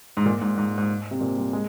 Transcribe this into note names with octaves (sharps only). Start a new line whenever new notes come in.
G#2
A#2
G#2
G#2
G#2
C3
A#2
G3
G#3